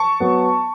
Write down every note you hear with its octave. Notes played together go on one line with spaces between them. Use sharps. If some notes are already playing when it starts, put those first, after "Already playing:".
Already playing: A5 C#6
F#3 B3